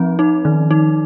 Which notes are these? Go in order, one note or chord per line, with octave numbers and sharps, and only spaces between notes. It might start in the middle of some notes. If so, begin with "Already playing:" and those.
Already playing: F3 C4 D#4
D#4
D#3
D#4